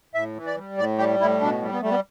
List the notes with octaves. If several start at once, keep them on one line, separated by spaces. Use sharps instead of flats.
A2 E5
E3
D5
G3
A2 D5
G3 G4
A2 E4
B2 D4
G3
B3
G3 A3
B3